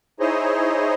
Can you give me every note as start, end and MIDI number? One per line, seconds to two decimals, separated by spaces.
0.20 0.95 63
0.20 0.95 64
0.20 0.95 68
0.20 0.95 72
0.20 0.95 73
0.20 0.95 75